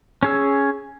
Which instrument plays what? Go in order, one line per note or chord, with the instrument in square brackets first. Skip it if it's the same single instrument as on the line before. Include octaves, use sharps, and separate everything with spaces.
[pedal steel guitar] C#4 G#4 E6